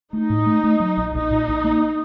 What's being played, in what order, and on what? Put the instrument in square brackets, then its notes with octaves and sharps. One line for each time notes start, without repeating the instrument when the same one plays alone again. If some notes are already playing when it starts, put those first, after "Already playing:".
[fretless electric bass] A3 [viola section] D#4
[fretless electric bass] A2
A3
A3
F#3
A#1
[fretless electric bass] A#1 [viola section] D#4
[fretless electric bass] A#2
A#1
A#3